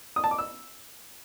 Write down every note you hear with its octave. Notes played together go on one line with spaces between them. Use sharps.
D#6
A5
D6
E6